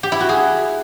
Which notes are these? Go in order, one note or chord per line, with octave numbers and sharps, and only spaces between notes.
G4
E4
F#4
G#4